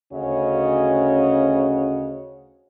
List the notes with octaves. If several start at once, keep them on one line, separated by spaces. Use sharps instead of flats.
D2 C#3 C#4 F#4 C#5 D#5